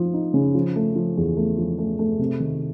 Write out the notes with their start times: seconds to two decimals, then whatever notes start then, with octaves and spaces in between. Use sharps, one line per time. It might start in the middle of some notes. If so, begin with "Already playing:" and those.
Already playing: F3 D#4
0.13 D#4
0.34 C#3
0.55 F3
0.76 A3
0.96 F3
1.17 E2
1.37 A3
1.58 F3
1.78 A3
1.99 A3
2.19 C3
2.40 D#3